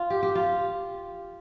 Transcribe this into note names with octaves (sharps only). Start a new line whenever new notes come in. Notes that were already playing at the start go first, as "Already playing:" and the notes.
Already playing: F4
G4
G4
F4